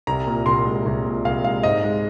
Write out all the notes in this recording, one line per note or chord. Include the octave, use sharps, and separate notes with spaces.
C2 A#5
A#2
C2 C6
G#3
C2
A#2
C2 F5
G#3 F5
G#2 D#5
G#3